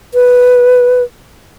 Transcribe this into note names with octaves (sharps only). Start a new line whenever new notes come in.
B4